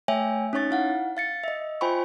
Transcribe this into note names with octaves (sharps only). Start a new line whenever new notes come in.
A3 C#5 E5 G5 G#5
C#4 D#4 C#5 C#6 A6
E4 F5 F#5
F5 A6 C#7
D#5 E5
F4 C5 G5 G#5 B5 C#6